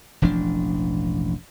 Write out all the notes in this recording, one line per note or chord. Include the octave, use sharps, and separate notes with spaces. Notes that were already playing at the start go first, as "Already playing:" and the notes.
E1 A1 F3 D4